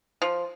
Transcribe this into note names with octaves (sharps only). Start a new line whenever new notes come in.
F3